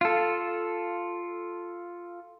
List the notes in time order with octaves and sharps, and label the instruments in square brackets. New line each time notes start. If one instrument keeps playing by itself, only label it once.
[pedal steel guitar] F4 A4